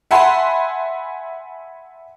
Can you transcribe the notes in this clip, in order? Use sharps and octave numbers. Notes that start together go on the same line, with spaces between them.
E5 F#5 G#5 A5 B5 C6